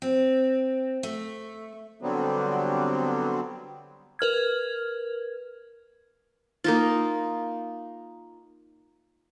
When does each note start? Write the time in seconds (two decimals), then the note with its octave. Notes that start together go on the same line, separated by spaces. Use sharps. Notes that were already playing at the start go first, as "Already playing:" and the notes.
0.02 C4
1.03 A3
2.01 D3 F#3 G3 B3 C4
4.19 A#4 B4 F6 G#6
6.64 A#3 D#4 F4